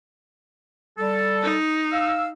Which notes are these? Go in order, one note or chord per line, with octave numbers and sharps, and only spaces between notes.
G3 A4
D#4
F5 E6